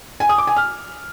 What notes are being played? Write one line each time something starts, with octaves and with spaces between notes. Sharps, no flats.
G#5
D#6
D6
G#5
F6